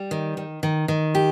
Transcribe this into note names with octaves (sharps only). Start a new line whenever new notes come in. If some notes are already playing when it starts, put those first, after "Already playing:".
Already playing: G3
D#3
D#3
D#3
D#3
G4